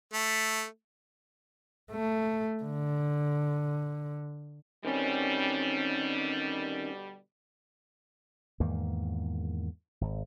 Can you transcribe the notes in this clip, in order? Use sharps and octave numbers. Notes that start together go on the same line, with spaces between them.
A3
A3
D3
B2 D3 D#3 G3 C4 C#4
E2 G#2 D#3 A#3
G#1